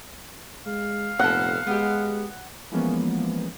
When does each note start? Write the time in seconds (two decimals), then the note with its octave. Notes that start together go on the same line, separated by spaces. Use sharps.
0.66 G#3 F5
1.19 F1 A#2 B3 A4 F#5
1.67 G#3 B3 G4
2.72 E3 F3 G#3 A#3 B3 C#4